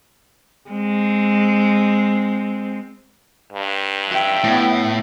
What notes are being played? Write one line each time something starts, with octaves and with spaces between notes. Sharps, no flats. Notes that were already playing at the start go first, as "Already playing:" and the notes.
G#3 C4
G2
E5 G5
A2 B3